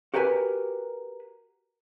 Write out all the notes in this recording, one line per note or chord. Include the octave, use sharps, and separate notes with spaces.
F#4 G4 A#4 B4 G#5 B5